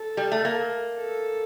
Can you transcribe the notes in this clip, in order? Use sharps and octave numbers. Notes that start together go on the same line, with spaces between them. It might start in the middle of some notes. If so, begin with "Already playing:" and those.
Already playing: A4
G3
A3
A#3
A4